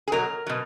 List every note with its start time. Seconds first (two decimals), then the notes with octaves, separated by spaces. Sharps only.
0.08 G#4
0.12 B2 F#3 A#4
0.46 B2 F#3